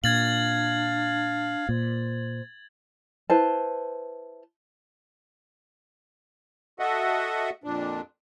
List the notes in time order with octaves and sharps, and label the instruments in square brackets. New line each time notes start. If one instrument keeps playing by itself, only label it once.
[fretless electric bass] A#2 [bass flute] D4 [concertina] F5 [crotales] G#6 A6 F#7
[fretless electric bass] A#2 [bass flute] C5
[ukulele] E4 B4 C5 A5
[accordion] F#4 A4 D#5 E5 F#5
F2 A#2 D4